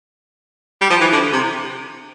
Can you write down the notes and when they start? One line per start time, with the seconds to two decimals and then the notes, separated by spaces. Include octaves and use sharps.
0.81 G3
0.90 F3
1.01 E3
1.12 D3
1.33 C3